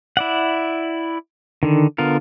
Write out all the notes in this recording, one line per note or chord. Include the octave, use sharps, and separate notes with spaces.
E4 D5 F#5
D3 D#3
D3 B3 F4 A#4